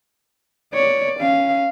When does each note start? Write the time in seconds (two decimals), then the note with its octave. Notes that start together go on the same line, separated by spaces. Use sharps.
0.73 C#5 D5
1.20 C#4 F5